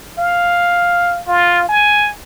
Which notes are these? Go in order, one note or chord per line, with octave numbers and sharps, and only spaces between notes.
F5
F4
G#5